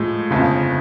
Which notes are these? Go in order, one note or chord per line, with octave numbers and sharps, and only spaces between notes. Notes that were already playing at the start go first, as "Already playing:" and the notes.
Already playing: A2 F3 G#3
G1 F2 C#3